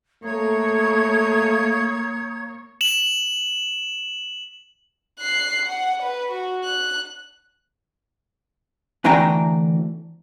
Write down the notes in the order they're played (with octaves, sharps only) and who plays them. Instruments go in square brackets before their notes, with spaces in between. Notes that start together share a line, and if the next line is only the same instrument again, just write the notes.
[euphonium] A3 [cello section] A#3 C#5 [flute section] A#5 D#6 G#6
[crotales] E7 F#7
[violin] F#6 C7
F#5
B4
F#4
F#6
[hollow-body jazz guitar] D2 E3 A3 D4 G5 A#5